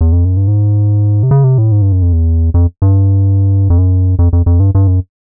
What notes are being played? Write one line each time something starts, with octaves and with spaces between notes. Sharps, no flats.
E2
F2
F#2
G2
G#2
C3
C#3
C3
A2
G#2
G2
F#2
F2
E2
F2
G2
F2
F#2
F2
F2
F2
G2
G2
F#2